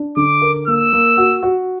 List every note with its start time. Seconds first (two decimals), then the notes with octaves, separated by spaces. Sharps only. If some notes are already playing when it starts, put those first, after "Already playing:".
Already playing: D4
0.17 D3 D6
0.42 A#4
0.68 A#3 E6
0.93 A#3
1.17 F#4
1.43 F#4